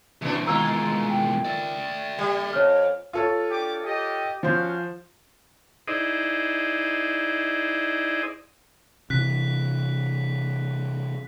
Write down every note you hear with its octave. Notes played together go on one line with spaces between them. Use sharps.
A#2 E3 C4 D4
E2 D#3 G#3 A#3 F4 A#5 E6
G5
D5 E5
G3
F2 C#5 F6
F4 A4 C#5
D4 G4 D6
G4 D#5
F3 C#4 F#4 C5 F5
D#4 E4 G#4 C5 D5 D#5
C3 E3 F#6 B6